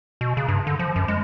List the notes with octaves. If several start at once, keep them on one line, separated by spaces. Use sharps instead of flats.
B2
C#3
G2
D3
F3
F#2
G#3